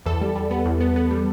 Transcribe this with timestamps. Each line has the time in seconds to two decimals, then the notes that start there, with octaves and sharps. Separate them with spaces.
0.06 E2 A4
0.21 G3
0.35 G3
0.51 B3
0.66 E2
0.80 B3
0.96 B3
1.11 G3